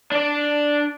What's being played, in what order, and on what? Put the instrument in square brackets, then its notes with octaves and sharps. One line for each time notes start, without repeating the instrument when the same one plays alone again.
[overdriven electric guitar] D4 D5